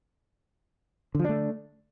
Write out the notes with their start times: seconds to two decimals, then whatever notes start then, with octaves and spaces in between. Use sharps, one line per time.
1.15 D3
1.19 F3
1.24 D4
1.29 A3